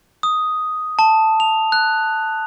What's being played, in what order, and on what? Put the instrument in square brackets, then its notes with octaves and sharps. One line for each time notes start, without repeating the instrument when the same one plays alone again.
[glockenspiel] D#6
A5
F7
F#6